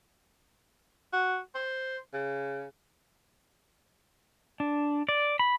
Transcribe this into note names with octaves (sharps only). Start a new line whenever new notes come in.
F#4
C5
C#3
D4
D5
B5